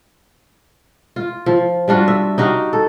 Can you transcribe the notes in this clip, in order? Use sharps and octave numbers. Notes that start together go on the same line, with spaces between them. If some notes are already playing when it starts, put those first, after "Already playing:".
F4
F3
G3 D4 F4 F#4
E5
D#4 F#4 G4 F5
A4